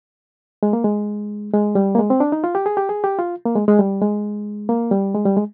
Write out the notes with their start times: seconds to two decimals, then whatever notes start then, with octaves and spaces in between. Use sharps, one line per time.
0.63 G#3
0.73 A#3
0.84 G#3
1.54 G#3
1.75 G3
1.95 A#3
1.99 G#3
2.10 C4
2.20 D4
2.32 D#4
2.44 F4
2.55 G4
2.66 G#4
2.77 G4
2.89 G#4
3.04 G4
3.19 F4
3.45 A#3
3.56 G#3
3.68 G#3
3.79 G3
4.02 G#3
4.69 A#3
4.91 G3
5.14 G#3
5.25 G3
5.37 G#3